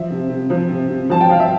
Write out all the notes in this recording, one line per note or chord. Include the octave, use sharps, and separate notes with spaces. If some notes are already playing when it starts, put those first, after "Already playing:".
Already playing: F3 E5
C3
C3
F3
C3
C3
F3 A5
G5
F3 F5
E5